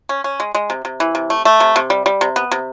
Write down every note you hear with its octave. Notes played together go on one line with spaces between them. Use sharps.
C#4
C#4
G#3
G#3
C3
C3
E3
C3
A3
A3
C3
C3
G3
G3
C3
B3
C3